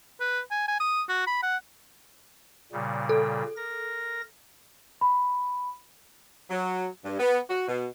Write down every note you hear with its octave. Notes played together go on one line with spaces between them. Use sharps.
B4
G#5
G#5
D#6
F#4
B5
F#5
A#2 C#3 G3
A4
A#4 A#6
B5
F#3
G2
B3
F#4
B2